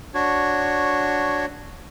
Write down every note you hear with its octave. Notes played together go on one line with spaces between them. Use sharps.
D4 F#4 C#5